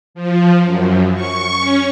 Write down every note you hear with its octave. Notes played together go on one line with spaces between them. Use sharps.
F3
F#2
C#6
C#4